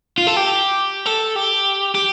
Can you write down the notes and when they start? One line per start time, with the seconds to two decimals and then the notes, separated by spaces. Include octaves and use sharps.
0.18 F4
0.27 A4
0.37 G4
1.06 A4
1.36 G4
1.95 G4